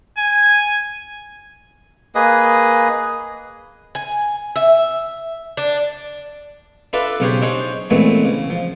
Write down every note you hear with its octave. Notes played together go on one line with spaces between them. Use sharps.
G#5
A#3 G#4 B4 D#5
G#5
E5
D4
D4 F4 A4 B4 D5 E5
B1 C#3 C#4 G4 G#4 C5
D4 D#4 G#4 C5 C#5
A#2 E3 G#3 A3 B3 C4
C#3
F3